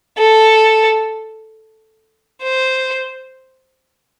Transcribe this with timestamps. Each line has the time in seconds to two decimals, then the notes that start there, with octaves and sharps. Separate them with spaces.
0.18 A4
2.43 C5